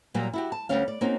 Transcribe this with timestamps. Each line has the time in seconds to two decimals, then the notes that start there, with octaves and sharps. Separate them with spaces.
0.14 A#2 F#3 G3 A#3
0.33 E4 F#4 G4
0.52 A5
0.69 D2 G3 C#4 F5
0.88 D5
1.01 A#3 C4 C#4 D#4 F#4